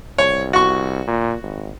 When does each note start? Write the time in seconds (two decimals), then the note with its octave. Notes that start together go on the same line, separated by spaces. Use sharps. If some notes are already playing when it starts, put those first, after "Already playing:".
0.18 C2 C#5
0.53 F#4 C#6
1.07 A#2
1.43 G#1